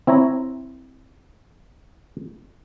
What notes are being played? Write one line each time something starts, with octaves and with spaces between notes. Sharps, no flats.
C4 E4 C#5 A#5